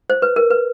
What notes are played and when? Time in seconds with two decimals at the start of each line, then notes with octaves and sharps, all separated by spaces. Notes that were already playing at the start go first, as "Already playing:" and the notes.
0.10 C5
0.22 B4
0.36 A#4
0.51 B4